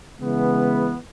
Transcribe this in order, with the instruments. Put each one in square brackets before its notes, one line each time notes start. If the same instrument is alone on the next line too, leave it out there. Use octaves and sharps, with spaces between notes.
[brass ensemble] C#3 E3 G#3 B3